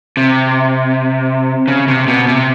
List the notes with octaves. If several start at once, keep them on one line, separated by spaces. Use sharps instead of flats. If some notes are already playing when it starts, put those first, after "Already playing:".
C3
C#3
C3
B2
C3